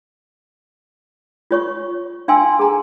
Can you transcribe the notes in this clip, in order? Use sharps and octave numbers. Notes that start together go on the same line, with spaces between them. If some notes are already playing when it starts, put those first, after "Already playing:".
F4 C#5 C#6
D4 F5 G5 G#5 C6 E6
G#4 A#5